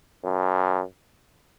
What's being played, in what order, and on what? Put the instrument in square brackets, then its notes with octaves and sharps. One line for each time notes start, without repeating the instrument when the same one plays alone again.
[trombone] F#2